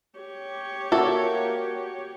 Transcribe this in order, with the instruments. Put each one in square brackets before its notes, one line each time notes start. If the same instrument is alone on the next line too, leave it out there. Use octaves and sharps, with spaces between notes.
[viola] G4 C#5
[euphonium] A#3 [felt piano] F#4 [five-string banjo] A4 D5 E5